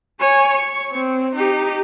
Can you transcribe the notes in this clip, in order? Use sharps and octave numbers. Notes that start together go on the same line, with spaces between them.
C#5 G#5
C#6
C4
D#4 G4